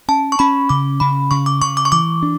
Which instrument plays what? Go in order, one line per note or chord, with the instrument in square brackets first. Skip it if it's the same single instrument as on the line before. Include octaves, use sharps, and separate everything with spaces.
[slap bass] C#4 [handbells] A5
[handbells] C#6
[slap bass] C#4 [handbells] B5
[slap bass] C#3 [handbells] D6
[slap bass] C#3 [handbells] B5
[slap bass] C#3 [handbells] C#6
[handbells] D6
[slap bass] C#3 [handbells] C#6
[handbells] D6
C#6
[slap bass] E3 [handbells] D6
[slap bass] D4